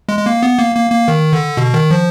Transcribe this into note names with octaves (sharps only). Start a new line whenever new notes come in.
G#3
G#3
A#3
B3
A#3
A#3
A#3
D#3
D3
B2
D#3
F3